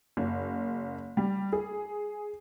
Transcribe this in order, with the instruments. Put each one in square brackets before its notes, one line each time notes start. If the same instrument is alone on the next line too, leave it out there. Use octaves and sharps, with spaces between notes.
[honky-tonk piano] F#1
G3
G#4